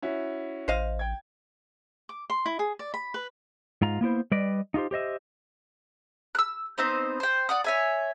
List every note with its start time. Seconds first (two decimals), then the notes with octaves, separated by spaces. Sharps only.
0.02 C#4 E4 F#4
0.68 A1 C5 D#5 F5
0.99 G5 G#6
2.09 D6
2.30 C6
2.46 E4
2.59 G#4
2.79 D5
2.94 B5
3.14 B4
3.82 G#2 F4 A#5
4.01 A#3 B3 E4 C5
4.31 G3 B4 D5 D#5
4.74 D#4 F4 G4 C5
4.91 G4 C5 D#5 E5
6.35 E6 F#6
6.78 B3 C4 D#4 C5
7.20 C5 G5
7.49 D5 F#5 D#6
7.64 C#5 E5 G#5